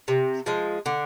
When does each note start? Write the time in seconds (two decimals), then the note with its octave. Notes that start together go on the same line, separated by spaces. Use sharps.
0.08 C3
0.46 F3 G#3
0.86 D3